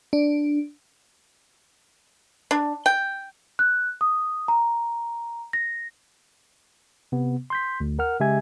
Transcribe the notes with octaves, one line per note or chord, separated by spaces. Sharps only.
D4
D4
G5
F#6
D#6
A#5
A#6
C3 B3
C6 G6 B6
D2
A#4 F#5 F6
C#3 G#3 G4 E5 G#5 G#6